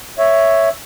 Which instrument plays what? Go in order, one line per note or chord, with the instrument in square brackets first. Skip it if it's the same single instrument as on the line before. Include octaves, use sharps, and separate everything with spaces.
[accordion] C#5 E5